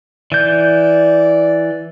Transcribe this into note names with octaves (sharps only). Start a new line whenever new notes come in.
E3 D5 G6